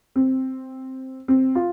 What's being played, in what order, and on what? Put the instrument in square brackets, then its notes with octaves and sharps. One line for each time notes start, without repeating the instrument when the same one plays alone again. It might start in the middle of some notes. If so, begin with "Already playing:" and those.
[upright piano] C4
C4
F4